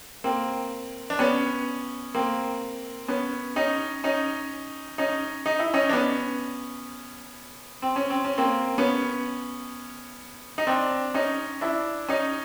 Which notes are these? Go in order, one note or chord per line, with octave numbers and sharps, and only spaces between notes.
A#3 C4
D4
B3 C#4
A#3 C4
B3 C#4
C#4 D#4
C#4 D#4
C#4 D#4
D#4
E4
C#4 D#4
D4
B3 C#4
C4
C#4
C4
C#4
A#3 C4
B3 C#4
D#4
C4 D4
C#4 D#4
D4 E4
C#4 D#4